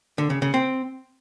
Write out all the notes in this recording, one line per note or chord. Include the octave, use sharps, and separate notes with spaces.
D3
C#3
C#3
C4